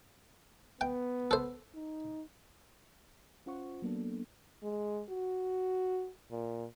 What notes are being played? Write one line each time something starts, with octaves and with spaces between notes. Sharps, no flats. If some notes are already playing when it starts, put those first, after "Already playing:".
B3 G5
A4 C5
D#4
C#4 F4 C5 F#5 C#6
F#3 A#3 B3 D4 A4
G#3
F#4
A#2